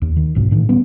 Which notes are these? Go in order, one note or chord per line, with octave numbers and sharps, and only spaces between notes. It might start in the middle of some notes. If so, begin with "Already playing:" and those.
D#2
D#3
B1 G#2 B2
A2 D#3 E3
G3 B3 C#4